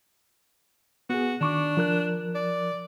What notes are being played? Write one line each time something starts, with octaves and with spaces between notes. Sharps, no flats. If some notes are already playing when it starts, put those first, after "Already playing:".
B3 F#4 G#4
D#3 D4 C#6 D6
F3 A#4 F#6
D5